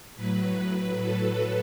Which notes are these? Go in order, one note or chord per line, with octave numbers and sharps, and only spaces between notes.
A2 F#3 B4
A4